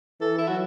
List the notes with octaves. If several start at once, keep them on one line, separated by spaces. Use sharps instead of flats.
E3 A4
E4
F#3 F#4